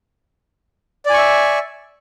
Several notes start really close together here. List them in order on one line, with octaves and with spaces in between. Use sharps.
D5 G#5 C#6 E5